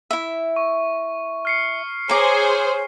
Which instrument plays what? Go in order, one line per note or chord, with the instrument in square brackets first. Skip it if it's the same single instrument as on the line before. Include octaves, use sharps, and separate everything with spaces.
[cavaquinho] E4 E5
[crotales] C#6
F6 C7 C#7
[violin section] G#4 C5 [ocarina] C#5 [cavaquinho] A#5 D6